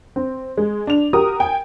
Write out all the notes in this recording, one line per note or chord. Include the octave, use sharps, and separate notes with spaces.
C4
G#3
D4 F7
F#4 G4 A#4 D#6
G5 G#5